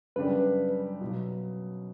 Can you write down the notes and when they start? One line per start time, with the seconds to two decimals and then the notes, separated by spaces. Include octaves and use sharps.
0.16 F#2 C#3 G3 D4 G4 B4
1.01 B2 F#3 B3